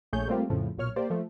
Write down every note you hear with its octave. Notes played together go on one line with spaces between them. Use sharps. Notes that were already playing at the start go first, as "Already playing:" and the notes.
A#1 A3 G#4 C#5 G6
G3 A3 A#3 C4 F4 G4
F2 A2 C#3 F3
B1 A#2 C#5 F6
A#3 G4 C5 D5
F3 A3